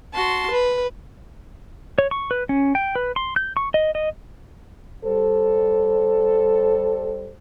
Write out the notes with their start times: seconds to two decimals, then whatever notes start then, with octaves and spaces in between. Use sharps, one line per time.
0.14 F#4 A5 C6
0.52 B4
1.98 C#5
2.11 C#6
2.31 B4
2.49 C#4
2.75 G5
2.95 B4
3.16 C6
3.36 G6
3.57 C#6
3.74 D#5
3.95 D#5
5.05 G3 A4 C5